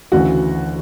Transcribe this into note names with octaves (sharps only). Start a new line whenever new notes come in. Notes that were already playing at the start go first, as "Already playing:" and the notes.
D2 C#3 E3 F#4